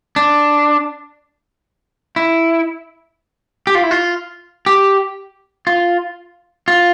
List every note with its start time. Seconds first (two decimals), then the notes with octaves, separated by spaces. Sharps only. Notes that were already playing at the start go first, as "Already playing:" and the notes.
0.16 D4
2.16 E4
3.67 G4
3.75 F4
3.83 E4
3.91 F4
4.66 G4
5.67 F4
6.68 F4